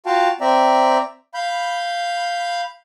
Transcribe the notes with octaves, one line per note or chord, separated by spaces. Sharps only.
F4 F#4 F5 G5 A5
C4 D5 E5 G5 A#5
F5 B5 G6